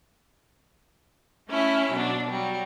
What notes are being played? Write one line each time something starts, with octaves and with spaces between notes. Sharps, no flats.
A3 C#4 E4 E5
B2 F#3 D4
F#3 G3